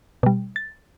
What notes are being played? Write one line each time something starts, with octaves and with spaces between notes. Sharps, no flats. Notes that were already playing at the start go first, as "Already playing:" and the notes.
B2 G3
A6